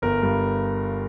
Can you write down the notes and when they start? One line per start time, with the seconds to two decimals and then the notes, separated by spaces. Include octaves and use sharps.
0.02 G1 A#4
0.22 G2